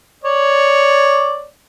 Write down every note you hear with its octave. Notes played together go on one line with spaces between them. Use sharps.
C#5 D5